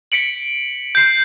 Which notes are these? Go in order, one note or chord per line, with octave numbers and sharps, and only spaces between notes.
B6 C#7 D7 F#7
G6 C7